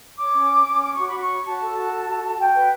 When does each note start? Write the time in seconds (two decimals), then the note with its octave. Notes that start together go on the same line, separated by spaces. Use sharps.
0.19 C#5 D6
0.34 C#4
0.51 C#5
0.66 C#4
0.81 C#5 D6
0.94 F#4 C#6
1.07 B5
1.14 F#4
1.19 C#6
1.29 C#5
1.45 F#4 A5
1.61 A4
1.76 F#4
1.92 A4
2.08 F#4
2.23 F#4
2.38 F#4 G5
2.55 B4